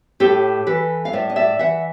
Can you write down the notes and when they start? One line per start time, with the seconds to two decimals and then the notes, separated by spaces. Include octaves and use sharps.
0.20 A2 G4 A4
0.67 E3 A4 B4
1.05 F5
1.13 A2 D5 E5
1.30 D#5
1.36 D5 E5
1.59 E3 E5 F#5